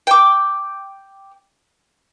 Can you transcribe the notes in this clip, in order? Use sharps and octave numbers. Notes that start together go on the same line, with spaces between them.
G5 D6